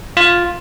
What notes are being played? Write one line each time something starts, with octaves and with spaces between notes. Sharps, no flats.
F4